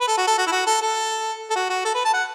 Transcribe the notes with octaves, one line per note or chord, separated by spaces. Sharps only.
B4
A4
F#4
A4
F#4
E4
F#4
A4
A4
A4
F#4
F#4
A4
B4
A5
F#5